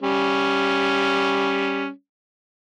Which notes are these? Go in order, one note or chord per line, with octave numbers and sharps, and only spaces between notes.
G3 C#4